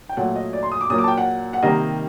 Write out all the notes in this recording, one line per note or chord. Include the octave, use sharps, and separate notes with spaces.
G5
A#2 F#3 A3 F#5
D#5
D5
C6
D#6
D6
A#2 F#3 A#3 D#6
D6
A5
G5
F#5
F#5
C3 D#3 G3 A#3 D#5